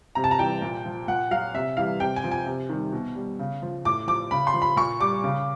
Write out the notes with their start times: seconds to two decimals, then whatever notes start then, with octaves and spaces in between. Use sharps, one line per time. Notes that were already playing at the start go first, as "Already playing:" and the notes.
0.15 C3 A#5
0.24 A5
0.31 A#5
0.39 E3 G3 G5
0.62 A#2
0.86 F3
1.08 A#2 F#5
1.31 F#3 F5
1.54 C3 E5
1.77 E3 G3 F5
2.00 C3 G5
2.16 G#5
2.24 F3
2.32 G#5
2.46 C3
2.69 D#3 G3
2.92 B2
3.15 G3
3.39 C#3
3.62 F3
3.85 A2 D6
4.07 F3 D6
4.31 C#3 B5
4.47 C6
4.54 F3
4.62 B5
4.76 A#2 C#6
5.00 G3 D6
5.24 C#3